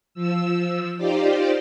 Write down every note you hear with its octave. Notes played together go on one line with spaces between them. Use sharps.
F3 E6
D#4 F4 G4 C5 D5